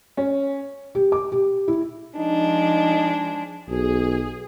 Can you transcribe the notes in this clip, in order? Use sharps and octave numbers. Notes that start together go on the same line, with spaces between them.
C#4
G4
D6
G4
E4
F3 G#3 D4 D#4
B1 G#4